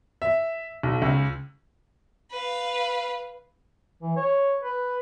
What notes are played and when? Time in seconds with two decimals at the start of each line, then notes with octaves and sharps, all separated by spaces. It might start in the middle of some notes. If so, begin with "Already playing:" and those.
0.22 E5
0.83 B1
1.02 C#2
2.31 B4 F5
4.02 E3
4.17 C#5
4.63 B4